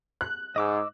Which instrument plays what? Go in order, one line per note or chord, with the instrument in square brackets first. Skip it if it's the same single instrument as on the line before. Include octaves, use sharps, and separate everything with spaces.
[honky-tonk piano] F#6
[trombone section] G#2 [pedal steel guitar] D#5 D6 E6